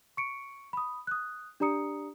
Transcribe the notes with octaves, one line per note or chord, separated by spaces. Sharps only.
C#6 C#7 D7
B5 D#6
D#6 F#6
D4 G4 D5 A#5 D#6 C#7